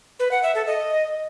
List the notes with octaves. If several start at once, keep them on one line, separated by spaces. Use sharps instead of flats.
B4
F#5
E5
A4
D#5